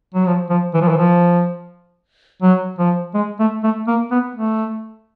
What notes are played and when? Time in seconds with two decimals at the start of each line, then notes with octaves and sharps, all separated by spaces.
0.14 F#3
0.26 F3
0.50 F3
0.74 E3
0.82 F3
0.89 E3
0.98 F3
2.42 F#3
2.79 F3
3.14 G#3
3.39 A3
3.63 A3
3.87 A#3
4.11 B3
4.35 A3